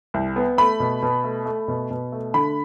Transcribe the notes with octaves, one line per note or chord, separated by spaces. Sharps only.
C2
B3
A3 B5
B2
B2
A3
A3
B2
B2
A3
D3 B5